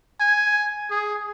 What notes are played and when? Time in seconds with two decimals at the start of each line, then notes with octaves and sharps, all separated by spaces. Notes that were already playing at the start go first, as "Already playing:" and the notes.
0.21 G#5
0.91 G#4